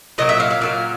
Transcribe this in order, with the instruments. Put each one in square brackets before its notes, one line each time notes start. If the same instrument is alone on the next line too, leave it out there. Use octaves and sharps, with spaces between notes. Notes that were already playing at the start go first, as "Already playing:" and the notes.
[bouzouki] A#2 F#3 A#3 D#5
E5
F5
F5
A#2 F#3 A#3 F5